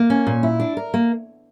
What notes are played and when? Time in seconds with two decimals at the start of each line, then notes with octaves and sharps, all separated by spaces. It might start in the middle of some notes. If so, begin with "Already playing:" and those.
Already playing: A#3
0.10 C#4
0.27 A#2
0.43 E4
0.60 D4
0.77 A#4
0.94 A#3